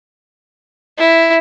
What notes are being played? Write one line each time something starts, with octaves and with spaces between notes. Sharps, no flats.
E4